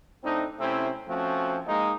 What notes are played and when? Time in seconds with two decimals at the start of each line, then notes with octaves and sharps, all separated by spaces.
0.24 A2 C4 D4 D#4
0.59 C3 A3 C4 C#4 E4
1.08 F3 A3 C4 C#4 F#4
1.67 G#3 A#3 D#4